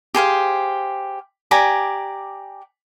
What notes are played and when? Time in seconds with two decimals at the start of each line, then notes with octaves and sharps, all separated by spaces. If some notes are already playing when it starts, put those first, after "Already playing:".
0.14 G4 G#4 C5 F5
1.51 G4 D5 G#5 A#5